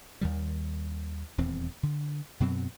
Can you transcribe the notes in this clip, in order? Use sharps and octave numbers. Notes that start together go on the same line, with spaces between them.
D#2 D#3 G3
D#1 E2 C4
D3
F#2 B2 F#3 C4